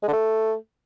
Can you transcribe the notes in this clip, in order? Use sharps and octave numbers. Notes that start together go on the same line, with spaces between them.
G#3
D3
A3